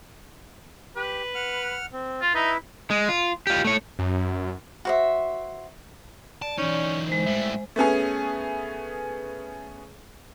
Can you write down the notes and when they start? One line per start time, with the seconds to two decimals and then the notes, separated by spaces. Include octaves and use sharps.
0.96 G4 B4
1.35 F#5 F6
1.93 C4
2.21 F4
2.34 D#4 E4 B4 E5
2.90 G#3
3.09 F4
3.47 F4 G4
3.65 A3 C#5
3.99 F#2
4.85 F#4 C5 E5
6.42 D5 A5
6.58 E3 C#4 D#4
7.08 G#3 C5
7.26 A2 G3 E5
7.76 A3 B3 C#4 G#4